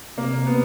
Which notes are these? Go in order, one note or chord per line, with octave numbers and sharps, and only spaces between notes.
C3 A#3
B3